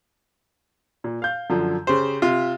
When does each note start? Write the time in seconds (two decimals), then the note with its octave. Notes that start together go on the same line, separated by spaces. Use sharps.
1.04 A#2
1.22 F5 G6
1.50 F#2 D3 F3
1.87 C#3 G4 C5
2.22 C3 F4